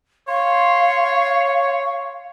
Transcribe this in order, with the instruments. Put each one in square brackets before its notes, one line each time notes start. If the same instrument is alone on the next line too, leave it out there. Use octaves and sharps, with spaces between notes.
[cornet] C#5 [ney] F5 [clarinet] C6